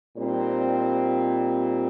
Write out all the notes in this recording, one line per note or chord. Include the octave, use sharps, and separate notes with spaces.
A#2 G3 C4 D#4 C5